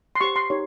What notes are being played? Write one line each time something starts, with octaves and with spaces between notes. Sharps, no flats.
C6
G4 C5 C#6
C6
D#4 G4 A#4 C#5